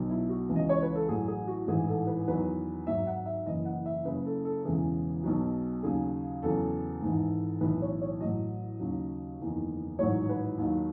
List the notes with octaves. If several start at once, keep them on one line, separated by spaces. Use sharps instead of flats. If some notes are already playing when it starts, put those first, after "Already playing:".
Already playing: B1 B2 F#3
E4
F#4
C#2 C#3 E3
D#5
C#5
B4
A4
A1 A2 F#3 G#4
G#4
F#4
A1 G#2 E3 G#4
A4
B4
E2 D#3 F#3 B4
G#1 G#2 F#3 E5
F#5
E5
F#1 F#2 E3 D#5
F#5
E5
F#1 F#2 C#3 B4
A4
A4
E1 E2 C#3 E3 G#4
B1 B2 F#3
D#2 C#3 F#3 G#4
E2 C#3 F#3 A4
G#1 G#2 E3
B1 A2 E3 B4
C#5
C#5
A1 A2 F#3 D#5
D#2 C#3 F#3
F#1 E2 D#3
A1 G#2 D#3 F#3 C#5
B4
D#2 D#3 F#3